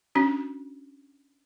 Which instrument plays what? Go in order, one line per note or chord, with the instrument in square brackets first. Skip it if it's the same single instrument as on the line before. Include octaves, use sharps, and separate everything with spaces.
[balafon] C#4 D4 F#4